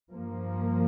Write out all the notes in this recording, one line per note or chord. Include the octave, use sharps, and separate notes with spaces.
G2 F3 A#3